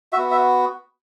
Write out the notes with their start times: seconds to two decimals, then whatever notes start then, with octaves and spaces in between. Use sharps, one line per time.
0.13 B3 F#4 E5
0.31 E5